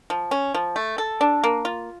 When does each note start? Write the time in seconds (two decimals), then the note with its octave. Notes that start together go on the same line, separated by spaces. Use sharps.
0.10 F3
0.31 C#4
0.54 F3
0.76 A3
0.98 A4
1.21 D4
1.44 A#3
1.65 F4